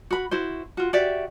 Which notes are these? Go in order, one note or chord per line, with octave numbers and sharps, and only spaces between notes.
F#4 B5
E4 F#4 C5
F4 F#4
F#4 G4 D5 E5